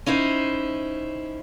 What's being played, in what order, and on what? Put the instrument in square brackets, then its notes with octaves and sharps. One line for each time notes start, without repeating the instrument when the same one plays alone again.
[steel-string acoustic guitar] C#4 D#4 E4 C5